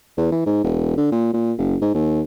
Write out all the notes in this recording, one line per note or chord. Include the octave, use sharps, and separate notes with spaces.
E2
E3
G#2
E1
D3
A#2
A#2
F#1
G#2
D#2